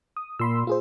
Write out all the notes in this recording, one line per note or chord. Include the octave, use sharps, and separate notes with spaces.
D#6
A#2 B5 C6 E6
F4 G#4 C5